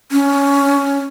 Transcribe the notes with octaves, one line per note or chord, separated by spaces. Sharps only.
C#4